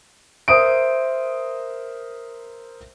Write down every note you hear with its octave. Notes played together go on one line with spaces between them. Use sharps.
A#4 C5 E5 D#6 D7